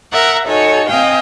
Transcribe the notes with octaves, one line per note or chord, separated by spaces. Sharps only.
A#4 E5 F#5 A#5
D#4 F#4 A4 C#5 G#5
C4 D#5 F5 G5 G#5